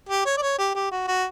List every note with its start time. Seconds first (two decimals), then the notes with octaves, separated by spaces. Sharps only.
0.09 G4
0.25 C#5
0.37 D5
0.42 C#5
0.58 G4
0.75 G4
0.91 F#4
1.08 F#4